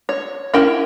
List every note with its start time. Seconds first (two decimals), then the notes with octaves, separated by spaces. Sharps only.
0.09 C#5
0.54 C#4 E4 A#4 G5